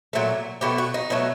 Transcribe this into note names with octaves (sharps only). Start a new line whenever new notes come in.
A#2 F#3 A3
B2 F#3 A3 G4
F#4
D#4
B2 F#3 A3